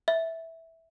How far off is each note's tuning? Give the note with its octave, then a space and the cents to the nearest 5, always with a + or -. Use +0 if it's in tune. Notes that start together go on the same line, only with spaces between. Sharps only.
E5 -10